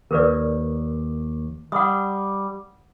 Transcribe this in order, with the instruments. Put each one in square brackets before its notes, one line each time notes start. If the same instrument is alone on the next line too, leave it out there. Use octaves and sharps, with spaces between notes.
[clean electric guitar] D#2 [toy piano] A#4 B4 D5
[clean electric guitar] G3 [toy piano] F#5 D#6